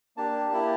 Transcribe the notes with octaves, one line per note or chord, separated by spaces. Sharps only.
A#3 D4 G4 A5
A#3 E4 G4